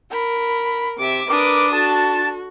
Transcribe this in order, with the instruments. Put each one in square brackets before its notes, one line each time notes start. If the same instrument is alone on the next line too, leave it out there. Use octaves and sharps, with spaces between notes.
[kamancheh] A#4 B5
[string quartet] C3 E5 [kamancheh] D6
[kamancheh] D4 [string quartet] A#4 B4 D#6 [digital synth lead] D6
[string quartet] F#4 A4 [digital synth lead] A5